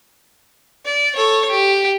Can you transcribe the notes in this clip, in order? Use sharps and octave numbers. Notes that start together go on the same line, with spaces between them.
D5
A4 C#5
G4